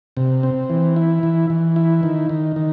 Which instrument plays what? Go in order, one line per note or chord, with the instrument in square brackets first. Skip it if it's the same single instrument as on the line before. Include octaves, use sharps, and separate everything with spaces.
[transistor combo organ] C3
C4
E3
E4
E3
E3
E4
D#3
D#3
D#3